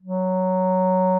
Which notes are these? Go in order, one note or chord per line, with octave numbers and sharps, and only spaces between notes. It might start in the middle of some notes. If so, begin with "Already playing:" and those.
F#3